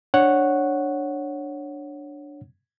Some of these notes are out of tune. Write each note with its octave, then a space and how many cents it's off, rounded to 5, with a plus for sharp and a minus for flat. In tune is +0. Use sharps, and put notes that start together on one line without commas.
D4 +0 C#5 -10 F#5 +0